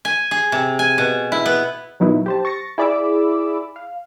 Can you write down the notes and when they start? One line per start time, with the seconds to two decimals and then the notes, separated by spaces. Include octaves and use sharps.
0.05 G#5
0.31 G#4
0.52 C3
0.79 G#5
0.98 B2
1.32 E4
1.46 B3
2.00 A#2 F3 F#3 B3 D#4 E4
2.26 G4 C5 A5
2.45 C#6 A6 A#6 C#7
2.78 E4 G#4 D5 B5 D6 E6
3.76 F5